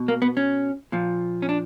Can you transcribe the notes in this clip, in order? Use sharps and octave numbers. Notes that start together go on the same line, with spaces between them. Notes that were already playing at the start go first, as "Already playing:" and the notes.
Already playing: B2
A#3
B3
C#4
A#2 F3
C#4
D4